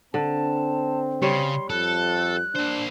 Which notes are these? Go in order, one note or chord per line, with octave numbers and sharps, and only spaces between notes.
D3 C4 A5
C#3 G3 C#5 C6
F2 A4 F#6
A#3 D4 C5